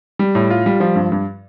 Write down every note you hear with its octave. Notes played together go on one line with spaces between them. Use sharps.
G3
A2
F4
G3
F3
G2
G2